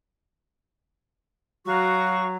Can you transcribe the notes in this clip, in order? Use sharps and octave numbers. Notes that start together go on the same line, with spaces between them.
F#3 F#4 F5 C#6